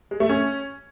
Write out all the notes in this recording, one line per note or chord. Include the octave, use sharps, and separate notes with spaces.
G#3
A3
C#4